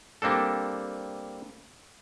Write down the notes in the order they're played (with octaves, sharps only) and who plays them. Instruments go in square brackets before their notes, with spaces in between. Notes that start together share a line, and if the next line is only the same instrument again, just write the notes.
[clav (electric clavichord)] G3 A#3 C4 D4 A4